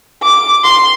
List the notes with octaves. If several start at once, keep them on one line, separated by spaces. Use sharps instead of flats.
D6
C6